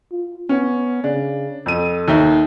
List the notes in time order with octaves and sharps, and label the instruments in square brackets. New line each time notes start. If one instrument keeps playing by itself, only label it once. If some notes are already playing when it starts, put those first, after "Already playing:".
[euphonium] F4
[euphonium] B3 [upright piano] C#4
[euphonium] C#3 [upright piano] D4
[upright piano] F2 D#7 [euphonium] A4
[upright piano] D#2 D#4 E5